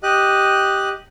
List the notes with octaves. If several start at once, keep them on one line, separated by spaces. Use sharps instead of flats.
G4 D#5 F#6